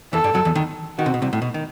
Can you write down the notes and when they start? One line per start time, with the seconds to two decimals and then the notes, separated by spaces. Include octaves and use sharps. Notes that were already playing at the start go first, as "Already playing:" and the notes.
0.13 E2 E3 A4
0.24 G2 G3
0.35 F#2 F#3
0.45 E2 E3
0.55 D#2 D#3
0.99 D#3 F#4
1.06 C3
1.14 B2
1.22 C2 C3
1.33 A2
1.42 B2
1.54 D#3